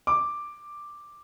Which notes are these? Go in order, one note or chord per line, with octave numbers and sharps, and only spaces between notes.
D6